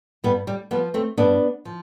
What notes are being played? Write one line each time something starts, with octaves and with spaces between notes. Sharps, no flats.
G2 G3 B3
G3
F3 G3 B3
A3 C4
G2 B3 D4
F3